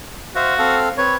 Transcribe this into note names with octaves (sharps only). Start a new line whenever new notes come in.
F#4 C5 E5 F5
C4 A4 F5
C4 B4 C#5